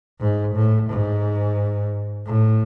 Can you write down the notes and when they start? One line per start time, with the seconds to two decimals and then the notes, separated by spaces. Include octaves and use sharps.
0.20 G#2
0.54 A2
0.89 G#2
2.26 A2